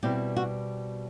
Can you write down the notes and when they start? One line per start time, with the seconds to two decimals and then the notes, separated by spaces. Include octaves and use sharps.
0.03 B2 G3 C4 E4 G4
0.36 F#4